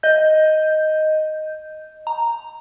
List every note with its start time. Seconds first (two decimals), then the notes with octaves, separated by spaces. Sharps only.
0.03 D#5 G6
2.07 A#5